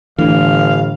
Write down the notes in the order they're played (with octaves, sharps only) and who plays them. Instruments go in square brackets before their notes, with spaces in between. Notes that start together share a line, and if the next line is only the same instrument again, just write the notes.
[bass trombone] G1 [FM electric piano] A2 D3 [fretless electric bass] E3 [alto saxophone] F5